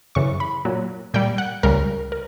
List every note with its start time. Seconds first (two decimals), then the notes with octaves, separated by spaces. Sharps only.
0.15 F#2 C#3 E3 C#6
0.40 B5
0.65 A#2 F#3
1.14 A#2 G3 G5
1.38 F#5
1.63 C#2 C#3 G3 A#4
2.12 A#4